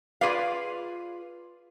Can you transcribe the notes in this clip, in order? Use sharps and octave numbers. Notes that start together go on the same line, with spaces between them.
F4 G#4 B4 D5 F5